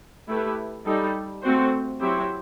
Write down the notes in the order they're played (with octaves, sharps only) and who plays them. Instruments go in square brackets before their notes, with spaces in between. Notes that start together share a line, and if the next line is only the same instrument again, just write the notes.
[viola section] A3 E4 G4 B4
G3 D#4 A4
A3 C4 F#4 C5
F#3 C4 E4 G4 C5